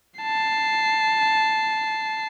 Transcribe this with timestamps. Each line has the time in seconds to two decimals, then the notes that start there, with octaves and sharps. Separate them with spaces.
0.20 A5 C7